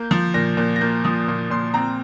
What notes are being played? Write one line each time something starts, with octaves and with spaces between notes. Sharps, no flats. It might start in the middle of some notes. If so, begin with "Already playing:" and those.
Already playing: A#3 G6
F3
A#2 A#6
A#2
A#6
A#3 G6
F3 D#6
A#2
A#2 C6
C4 A#5